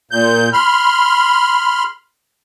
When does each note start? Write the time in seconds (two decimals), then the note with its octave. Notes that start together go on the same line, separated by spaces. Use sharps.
0.11 A#2 G6
0.53 B5 C6 F6